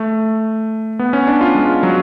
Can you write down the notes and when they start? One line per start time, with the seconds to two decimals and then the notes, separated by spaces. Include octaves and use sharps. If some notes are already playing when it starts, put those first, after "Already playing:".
Already playing: A3
0.99 B3
1.13 C#4
1.27 D4
1.41 F4
1.55 G#3
1.83 F#3